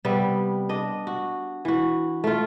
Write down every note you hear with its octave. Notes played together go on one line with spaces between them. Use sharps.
C3 G3 B3
D4 D#5
F#4
E3 F#4
A3 F4